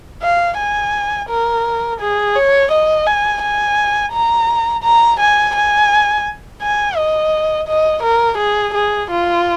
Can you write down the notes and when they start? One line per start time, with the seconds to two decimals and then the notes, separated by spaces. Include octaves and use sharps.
0.22 F5
0.58 G#5
1.29 A#4
2.00 G#4
2.35 C#5
2.72 D#5
3.06 G#5
3.42 G#5
4.12 A#5
4.83 A#5
5.20 G#5
5.55 G#5
6.62 G#5
6.96 D#5
7.67 D#5
8.02 A#4
8.38 G#4
8.74 G#4
9.10 F4